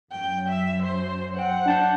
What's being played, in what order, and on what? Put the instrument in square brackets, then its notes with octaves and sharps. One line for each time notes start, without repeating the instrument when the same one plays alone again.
[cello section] F#2 [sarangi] G5
[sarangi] E5
C5
[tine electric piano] C5 G5 [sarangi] F#5
[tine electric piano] D4 A5 G6